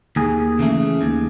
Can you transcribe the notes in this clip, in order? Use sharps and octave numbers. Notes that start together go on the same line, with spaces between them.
D#2 G#4
C#3 E3 A3
D#2